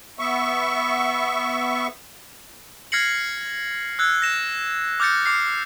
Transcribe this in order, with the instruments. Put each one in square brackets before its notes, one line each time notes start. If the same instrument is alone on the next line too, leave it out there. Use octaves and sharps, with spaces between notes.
[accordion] B3 E5 C#6
[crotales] F6 G#6 A#6 C7 C#7 F#7
E6 F#6 G#6
A#6 E7
D6 F6 G6 A6 C#7
D6 F6 C7